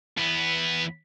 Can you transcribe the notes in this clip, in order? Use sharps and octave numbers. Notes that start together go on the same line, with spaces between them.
E2 B3